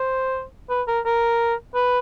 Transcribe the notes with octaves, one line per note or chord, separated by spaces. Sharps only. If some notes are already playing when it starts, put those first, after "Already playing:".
Already playing: C5
B4
A#4
A#4
B4